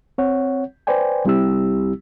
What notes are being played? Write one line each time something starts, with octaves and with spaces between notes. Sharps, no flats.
C4 C#5 F#5
B4 C5 D5 G5 G#5
C2 G3 C4 E4 G4 E6